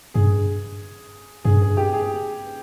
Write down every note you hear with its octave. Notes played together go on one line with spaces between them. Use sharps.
G2 G#4
G2 G#4
G#4
G4
G#4